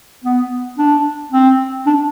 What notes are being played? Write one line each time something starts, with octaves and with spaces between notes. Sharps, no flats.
B3
D4
C4
D4